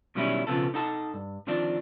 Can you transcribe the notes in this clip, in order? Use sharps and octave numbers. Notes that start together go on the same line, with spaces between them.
B2 D#3 F#3 G3 C#4 E4
B1 C#3 F3 B3 C4 A4
D#4 A4 F#5 A5
G2
D3 D#3 F3 C4 D4